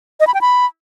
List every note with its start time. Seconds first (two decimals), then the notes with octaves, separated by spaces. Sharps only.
0.20 D#5
0.27 B5
0.34 G5
0.41 B5